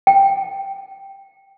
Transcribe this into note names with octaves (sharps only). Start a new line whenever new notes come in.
G5